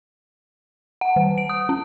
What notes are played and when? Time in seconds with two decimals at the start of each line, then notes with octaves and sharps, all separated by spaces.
1.01 F#5
1.16 D#3
1.38 D7
1.49 D#6
1.69 C#4